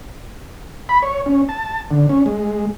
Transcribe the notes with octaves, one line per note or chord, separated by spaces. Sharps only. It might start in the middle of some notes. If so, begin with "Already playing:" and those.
B5
C#5
C#4
A5
D3
C#4
G#3